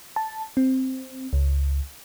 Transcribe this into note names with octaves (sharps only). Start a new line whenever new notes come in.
A5
C4
C#2